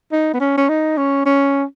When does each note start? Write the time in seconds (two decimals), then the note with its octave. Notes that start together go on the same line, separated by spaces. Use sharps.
0.12 D#4
0.34 B3
0.40 C#4
0.57 C#4
0.69 D#4
0.97 C#4
1.26 C#4